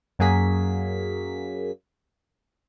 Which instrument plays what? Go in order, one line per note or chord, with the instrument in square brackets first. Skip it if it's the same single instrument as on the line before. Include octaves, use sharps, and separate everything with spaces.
[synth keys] F#2 F#3 A#3 G#4 B6